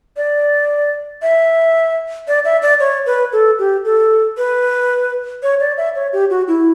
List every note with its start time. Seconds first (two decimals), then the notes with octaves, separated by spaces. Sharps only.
0.17 D5
1.22 E5
2.28 D5
2.45 E5
2.62 D5
2.80 C#5
3.06 B4
3.32 A4
3.59 G4
3.85 A4
4.37 B4
5.43 C#5
5.60 D5
5.78 E5
5.95 C#5
6.13 G4
6.30 F#4
6.48 E4